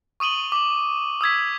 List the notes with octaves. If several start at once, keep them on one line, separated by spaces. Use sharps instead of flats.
C#6 D#6 D#7 F#7 G7
D6 F#7
D#6 E6 G#6 B6